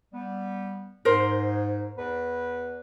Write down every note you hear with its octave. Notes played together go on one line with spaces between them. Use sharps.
G3 B3
G#2 A#4 C5
E2 B4